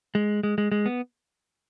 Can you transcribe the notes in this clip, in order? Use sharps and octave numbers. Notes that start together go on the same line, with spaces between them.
G#3
G#3
G#3
G#3
B3